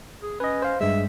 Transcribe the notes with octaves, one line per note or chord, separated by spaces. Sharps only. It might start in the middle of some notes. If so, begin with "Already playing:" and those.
G#4
C#4 B4 D#5
C5 F5
G2 G#3 E5